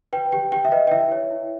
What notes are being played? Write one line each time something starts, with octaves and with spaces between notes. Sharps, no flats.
B4 G5
G4 G5
G4 G5
E5
B4 D#5
G5
E4 E5
C#5
E4